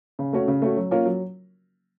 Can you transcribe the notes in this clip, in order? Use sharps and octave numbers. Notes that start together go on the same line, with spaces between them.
C#3
A3 C#4 F#4
C#3
A3 C#4 F#4
F#3
A#3 C#4 F4 A#4
F#3